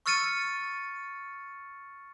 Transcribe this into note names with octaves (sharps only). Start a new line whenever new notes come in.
C#6 E6 F6 A6 C#7 D#7